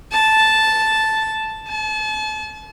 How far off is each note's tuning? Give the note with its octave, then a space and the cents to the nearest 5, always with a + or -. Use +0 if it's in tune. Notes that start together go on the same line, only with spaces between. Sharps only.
A5 -5
A5 -40